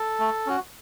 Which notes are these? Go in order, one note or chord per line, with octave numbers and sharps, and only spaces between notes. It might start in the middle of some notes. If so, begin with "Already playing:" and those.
Already playing: A4
A3
C#4 F#4